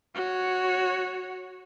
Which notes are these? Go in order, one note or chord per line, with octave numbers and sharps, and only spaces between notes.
F#4 C#5